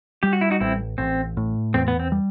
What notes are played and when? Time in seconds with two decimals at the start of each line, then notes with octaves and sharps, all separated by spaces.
0.23 G3 G4
0.33 F#4
0.41 E4
0.50 D#4 F#4
0.60 A1 C4 E4
0.98 A1 C4
1.37 A2
1.74 E2 C4
1.88 B3
2.00 C4
2.12 G3